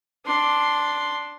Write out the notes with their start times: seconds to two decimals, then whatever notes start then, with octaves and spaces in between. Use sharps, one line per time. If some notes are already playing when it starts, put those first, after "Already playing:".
0.25 D4 C6